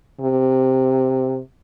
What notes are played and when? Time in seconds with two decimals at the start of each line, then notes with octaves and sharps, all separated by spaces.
0.21 C3